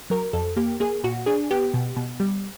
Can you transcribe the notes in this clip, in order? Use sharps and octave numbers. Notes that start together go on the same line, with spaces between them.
F#3 A#4
F2 A4
A#3 G4
A#3 G#4
A#2 F#4
D4 G#4
B3 G4
B2
B2
G3